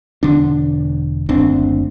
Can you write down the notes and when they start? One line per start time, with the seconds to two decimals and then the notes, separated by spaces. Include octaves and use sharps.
0.23 E1 D3 D4
1.29 F#1 D2 C4 D4